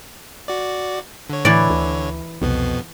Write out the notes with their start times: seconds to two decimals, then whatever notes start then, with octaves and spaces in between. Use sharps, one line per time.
0.48 F#4 D5
1.30 D3 C#5
1.45 A2 E3 D5
1.70 D2
2.42 C2 F2 B2 B3